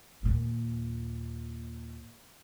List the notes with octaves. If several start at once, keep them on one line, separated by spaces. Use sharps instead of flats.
D#2 A#2